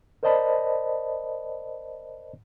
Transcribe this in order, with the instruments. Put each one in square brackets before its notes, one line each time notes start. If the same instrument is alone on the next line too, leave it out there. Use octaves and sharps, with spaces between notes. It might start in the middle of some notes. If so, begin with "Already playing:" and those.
[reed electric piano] A#4 C5 D5 D#5 A5 B5